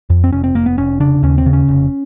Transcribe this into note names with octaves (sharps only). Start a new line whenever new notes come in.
F2
C4
F1 C#4
C4
F1 A#3
B3
F1 C#4
C#3 D4
D#2 C#4
C4
C#3
C#4
F1